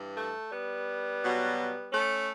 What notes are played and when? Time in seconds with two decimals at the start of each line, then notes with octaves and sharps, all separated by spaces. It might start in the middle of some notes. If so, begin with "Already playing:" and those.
Already playing: G2 E3
0.17 A3
0.52 G3 B3
1.23 B2 F#3
1.92 A3 C#4